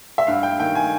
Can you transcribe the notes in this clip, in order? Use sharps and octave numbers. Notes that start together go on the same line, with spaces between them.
E5
G2 F5
G5
D#3 G5
G#5